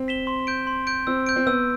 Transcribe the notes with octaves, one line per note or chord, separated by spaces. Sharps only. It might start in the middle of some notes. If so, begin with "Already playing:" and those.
Already playing: C4
B6 E7 G7
C6
G6 D7
C6
G6 D7
C4 E6
G6 D7
C4
B3 E6